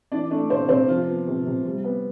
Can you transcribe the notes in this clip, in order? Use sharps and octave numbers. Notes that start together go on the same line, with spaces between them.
E3 D4 D5
A3 D4 D5
C3 C4 C5
C3 C4 C5
F3 F4
B3
C3
C3
G3
B3